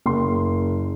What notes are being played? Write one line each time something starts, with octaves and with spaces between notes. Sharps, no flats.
F#1 C6